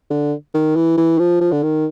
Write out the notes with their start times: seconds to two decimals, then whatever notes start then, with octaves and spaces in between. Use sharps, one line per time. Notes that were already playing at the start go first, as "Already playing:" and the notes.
0.10 D3
0.54 D#3
0.76 E3
0.97 E3
1.19 F3
1.40 F3
1.52 D3
1.63 D#3